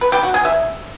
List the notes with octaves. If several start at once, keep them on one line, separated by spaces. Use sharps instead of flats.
B4
G4
F#4
G#4
E5